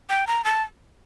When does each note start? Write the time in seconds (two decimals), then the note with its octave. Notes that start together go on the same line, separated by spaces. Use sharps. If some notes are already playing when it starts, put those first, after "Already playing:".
0.09 G5
0.27 A#5
0.44 A5